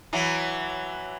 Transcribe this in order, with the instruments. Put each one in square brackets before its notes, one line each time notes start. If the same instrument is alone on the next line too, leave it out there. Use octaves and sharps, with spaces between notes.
[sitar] E3 F#3